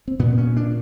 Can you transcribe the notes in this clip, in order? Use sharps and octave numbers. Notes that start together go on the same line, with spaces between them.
C4
A#2 B3
C#4
D4